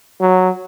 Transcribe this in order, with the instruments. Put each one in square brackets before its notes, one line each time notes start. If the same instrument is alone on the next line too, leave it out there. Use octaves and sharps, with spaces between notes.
[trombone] F#3